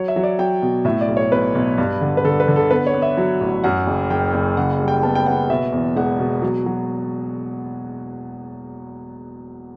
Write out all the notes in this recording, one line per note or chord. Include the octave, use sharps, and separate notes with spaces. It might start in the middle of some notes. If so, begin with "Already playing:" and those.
Already playing: F#3 C#5
E5
F#3
D5
F#3 G5
B2
A2 E5
D5
B1
C#5
B1 B4
B1
G2
D3
B4
D3 A4
B4
D3
A4
B3 B4
C#5
B3
E5
F#3
A1
F#2 F#5
F#1
F#1 G5
F#1 G5
C#3 F#5
F#5
G3
G5
B3 A5
G5
B3 F#5
B2 E5
E2
E1 F#5
B2
F#3
F#3